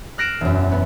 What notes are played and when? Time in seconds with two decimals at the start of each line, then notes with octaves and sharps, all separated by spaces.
0.18 F6 F#6 A#6 C7 D7 E7
0.41 E1 F#2
0.72 B3